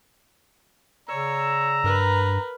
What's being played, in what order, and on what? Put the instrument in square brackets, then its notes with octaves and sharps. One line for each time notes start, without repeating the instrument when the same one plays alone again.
[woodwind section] C#3 D5 E6 [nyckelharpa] C#5 [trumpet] A#5
[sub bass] G2 [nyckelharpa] A#4 B4